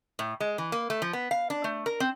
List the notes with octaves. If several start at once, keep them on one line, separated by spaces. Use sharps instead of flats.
A2
G#3
E3
A#3
A3
F3
B3
F5
D4
A3
A#4
C4